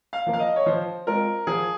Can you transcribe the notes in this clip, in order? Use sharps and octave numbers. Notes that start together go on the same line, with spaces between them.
F5
F3 A#3
F5
D#5
C#5
F3 C5
G#3 C4 F4 A#4
F3 G#4